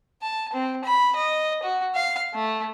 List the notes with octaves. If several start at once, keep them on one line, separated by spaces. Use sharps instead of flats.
A5
C4
B5
D#5
F#4
F5
A3